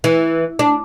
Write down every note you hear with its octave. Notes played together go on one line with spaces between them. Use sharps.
E3
D4